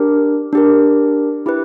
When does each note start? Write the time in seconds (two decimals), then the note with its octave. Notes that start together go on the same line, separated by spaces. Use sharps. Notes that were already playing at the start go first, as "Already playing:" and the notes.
Already playing: D4 G4 A#4
0.53 D4 G4 A#4
1.46 E4 G4 B4